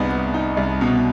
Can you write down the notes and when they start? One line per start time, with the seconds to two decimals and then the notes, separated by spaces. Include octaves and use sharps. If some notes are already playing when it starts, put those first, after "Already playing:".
Already playing: C2 B3 D#4
0.11 B3
0.34 D#4
0.57 C2
0.81 B2